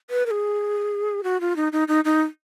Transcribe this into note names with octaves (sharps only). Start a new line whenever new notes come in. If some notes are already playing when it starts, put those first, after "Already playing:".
B4
A#4
G#4
F#4
F4
D#4
D#4
D#4
D#4